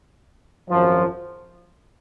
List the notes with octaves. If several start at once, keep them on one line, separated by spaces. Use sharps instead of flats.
G#1 F#2 F3